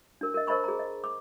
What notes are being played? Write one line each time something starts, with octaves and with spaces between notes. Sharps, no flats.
D4 A#4
A#4 D#5
A#4 C5 D#5 A5 B5 C#6
G#4 A#5
D#5
D6